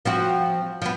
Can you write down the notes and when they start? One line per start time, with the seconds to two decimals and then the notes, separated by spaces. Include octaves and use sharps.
0.05 F3 C4 F#4
0.82 F3 B3